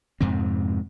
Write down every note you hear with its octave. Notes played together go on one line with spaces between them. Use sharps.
F2 G#2 C3 C4